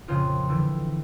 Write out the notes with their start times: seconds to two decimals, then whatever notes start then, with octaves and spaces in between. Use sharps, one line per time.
0.08 F2 A#2 C#3 C4 F4 D#5
0.49 D3 E3 A3